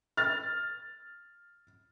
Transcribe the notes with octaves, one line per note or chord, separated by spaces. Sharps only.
F6 A6